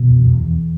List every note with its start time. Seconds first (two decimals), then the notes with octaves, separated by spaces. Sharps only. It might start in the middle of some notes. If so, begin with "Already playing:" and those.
Already playing: B2
0.09 E2
0.25 E2
0.40 E2